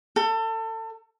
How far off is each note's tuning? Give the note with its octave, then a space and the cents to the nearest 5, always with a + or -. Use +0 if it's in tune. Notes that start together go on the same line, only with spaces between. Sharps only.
A4 +30